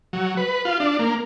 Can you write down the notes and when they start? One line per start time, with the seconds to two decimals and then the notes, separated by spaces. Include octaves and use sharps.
0.13 F#3
0.37 B4
0.65 F4
0.80 D4
0.99 A#3